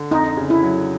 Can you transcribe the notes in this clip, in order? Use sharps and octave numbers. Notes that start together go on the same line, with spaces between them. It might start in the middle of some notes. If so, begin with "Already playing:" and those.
Already playing: D3
F2 D#4
C#3
E4
F#3